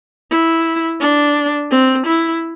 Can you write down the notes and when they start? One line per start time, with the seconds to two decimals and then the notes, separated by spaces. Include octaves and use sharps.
0.31 E4
1.00 D4
1.71 C4
2.07 E4